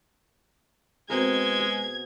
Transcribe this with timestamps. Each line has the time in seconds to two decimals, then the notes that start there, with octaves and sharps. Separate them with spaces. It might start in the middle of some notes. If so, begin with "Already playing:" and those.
1.10 B2 G#3 C4 A#4 G#6
1.60 G#4